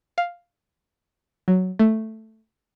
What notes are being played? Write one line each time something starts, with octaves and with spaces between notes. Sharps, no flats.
F5
F#3
A3